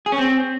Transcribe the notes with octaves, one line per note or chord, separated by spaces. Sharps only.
G#4
C#4
C4